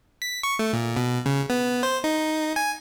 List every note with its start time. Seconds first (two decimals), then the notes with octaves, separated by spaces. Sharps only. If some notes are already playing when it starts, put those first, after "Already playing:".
0.22 B6
0.43 C#6
0.59 A3
0.73 A#2
0.96 B2
1.26 C#3
1.50 B3
1.83 C5
2.04 D#4
2.56 G#5